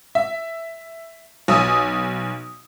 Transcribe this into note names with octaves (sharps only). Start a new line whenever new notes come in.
E5
B1 G#5 D#6 E6